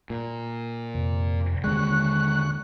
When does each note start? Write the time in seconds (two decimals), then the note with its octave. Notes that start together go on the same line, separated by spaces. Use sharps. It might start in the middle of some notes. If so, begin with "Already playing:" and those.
0.10 A#2
0.95 F2 C3
1.64 D#2 D3 G#3 C#6 F#6